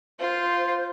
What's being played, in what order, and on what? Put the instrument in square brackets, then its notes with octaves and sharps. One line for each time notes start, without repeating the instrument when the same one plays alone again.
[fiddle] F4 C6 [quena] C5